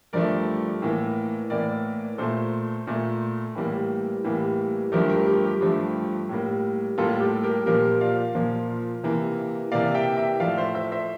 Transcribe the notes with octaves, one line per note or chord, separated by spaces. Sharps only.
G2 F3 A3 A#4 D5
A2 E3 A#3
A2 E3 A#3 A#4 D5
A#2 A3 A4 C5
A#2 A3
A2 E3 G3 A#3
A2 E3 G3 A#3
G2 F3 A3 G4 A#4
G4 A#4
G4 A#4
G4
G2 F3 A3 G4
A2 G3 A#3
A2 G3 A#3 F4 A4
G4
G4 A#4
A#2 F3 A#3 G4 A#4
D5 F5
A#2 F3 A#3
C3 E3 A#3
C3 E3 A#3 D5 F5
E5 G5
E5 G5
A2 F3 A3 D5 F5
C5 E5
C5 E5
C5 E5